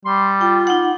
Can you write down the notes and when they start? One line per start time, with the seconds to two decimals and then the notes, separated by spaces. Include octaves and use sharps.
0.05 G3 C6
0.41 F4 G5
0.67 D#4 F#5